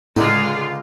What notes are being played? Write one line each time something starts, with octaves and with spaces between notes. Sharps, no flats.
C#2 A2 D3 G#3 D#4 F4